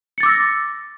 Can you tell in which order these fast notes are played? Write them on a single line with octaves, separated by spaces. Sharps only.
C#7 A6 D6 E6 A#6